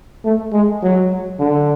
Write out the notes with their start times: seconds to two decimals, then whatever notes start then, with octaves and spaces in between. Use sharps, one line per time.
0.25 A3
0.53 G#3
0.83 F#3
1.39 D3